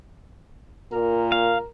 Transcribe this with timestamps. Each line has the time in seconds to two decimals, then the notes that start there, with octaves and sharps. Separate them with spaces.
0.92 A#2 A#4
1.32 F5